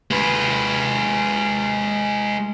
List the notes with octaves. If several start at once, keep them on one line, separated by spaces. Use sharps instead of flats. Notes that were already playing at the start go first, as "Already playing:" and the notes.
G#3 B4